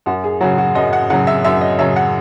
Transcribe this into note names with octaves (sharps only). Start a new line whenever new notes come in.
F#2 F#4
G#4
C#3 F#3 F#4
F#4
F#2 D#5
F#5
C#3 F#3 F#5
E5
F#2 E5
D#5
C#3 F#3 E5
F#5